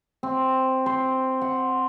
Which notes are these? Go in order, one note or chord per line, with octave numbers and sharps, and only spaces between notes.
C4
C5
F#5